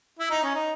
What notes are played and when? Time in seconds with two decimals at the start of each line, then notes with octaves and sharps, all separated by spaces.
0.19 E4
0.30 D#4
0.43 C#4
0.55 D#4